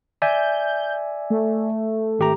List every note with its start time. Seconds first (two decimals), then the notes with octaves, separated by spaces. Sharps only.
0.22 D5 E5 G#5 G6
1.30 A3
2.19 G#1 G4 A#5